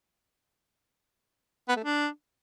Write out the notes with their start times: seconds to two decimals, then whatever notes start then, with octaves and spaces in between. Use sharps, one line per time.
1.69 B3
1.76 A3
1.84 D4